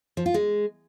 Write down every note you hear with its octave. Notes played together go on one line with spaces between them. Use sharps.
F3
F4
G#3